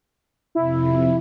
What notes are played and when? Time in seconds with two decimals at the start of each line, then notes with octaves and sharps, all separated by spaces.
0.55 F2 C3 E4